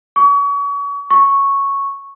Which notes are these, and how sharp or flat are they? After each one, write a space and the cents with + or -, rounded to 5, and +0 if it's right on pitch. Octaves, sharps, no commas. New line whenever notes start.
C#6 +35
C#6 -5